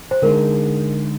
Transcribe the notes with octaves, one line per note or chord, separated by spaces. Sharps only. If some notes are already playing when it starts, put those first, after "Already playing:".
C5
D3 G#3 D#4 G#4 A#4